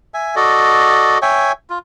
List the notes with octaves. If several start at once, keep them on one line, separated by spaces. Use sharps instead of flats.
E5 G#5
F#4 A4 D5 D#5
C#5 E5 G5 G#5
F4